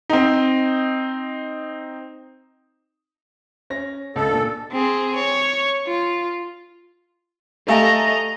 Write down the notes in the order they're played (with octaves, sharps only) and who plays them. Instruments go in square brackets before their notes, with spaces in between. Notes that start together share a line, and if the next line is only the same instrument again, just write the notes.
[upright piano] C4 D#4
C#4 A#6
[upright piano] C#2 [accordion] A4
[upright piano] A#2 D4
[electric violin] C4 G#4
C#5
F4
[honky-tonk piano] A3 [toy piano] G4 F5 G#5 [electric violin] D#5 A#5